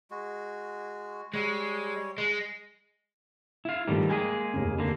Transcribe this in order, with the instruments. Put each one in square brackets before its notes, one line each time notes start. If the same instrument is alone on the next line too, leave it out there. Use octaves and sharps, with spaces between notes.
[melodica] G#3 F#4
[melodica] G3 C#5 [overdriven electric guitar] G#3
[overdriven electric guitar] G#3
[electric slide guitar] E4 F5
[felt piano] G#2 F3 A3 [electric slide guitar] D#3 G3
[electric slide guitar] G#3 A#3 G#4 [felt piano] D#5 G5 G#5
[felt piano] F1 D#2 C#3
[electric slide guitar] D3 A#3